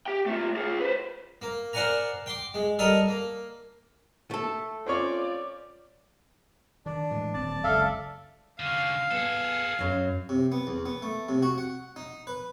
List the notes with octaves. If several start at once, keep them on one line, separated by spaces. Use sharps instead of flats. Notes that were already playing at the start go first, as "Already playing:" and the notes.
G4 G5
A3 F4
F4 G#4
B4 C5
A#3
A#4 C5 D5 F#5 G#5 A#5
G5 C6 D6
G#3
G3 A4 A#4 D#5 A#5 D#6
A#3
A3 A4
C4 C#4 F4 C#5 D5
D#3 D4
A2 E3 G#3
D#1 C4 D5 A5
F#1 C#2 A4 E5 F5
D3 C#4 F5
B3 G#4 A4
F#2 F#3
C3
B3
E2
B3
A3
C3
F#4
F#5
D#4
B4